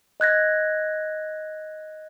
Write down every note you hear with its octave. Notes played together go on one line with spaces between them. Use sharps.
D#5 F#6 G#6 A#6